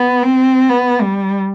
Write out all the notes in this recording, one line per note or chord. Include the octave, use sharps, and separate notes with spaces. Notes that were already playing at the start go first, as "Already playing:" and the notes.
Already playing: B3
C4
B3
G3